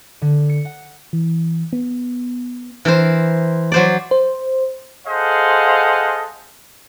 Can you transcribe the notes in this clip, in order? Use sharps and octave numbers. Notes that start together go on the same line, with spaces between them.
D3
C#7
F#5
E3
B3
E3 A#4 C5
F#3 C5 D5
C5
G#4 A4 C5 D#5 F5 F#5